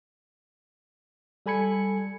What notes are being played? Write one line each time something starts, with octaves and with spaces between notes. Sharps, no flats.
G3 A4 G#5 B5 G#6 C#7